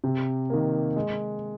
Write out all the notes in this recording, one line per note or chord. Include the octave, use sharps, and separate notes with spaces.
C3
D#3 A#3
G#3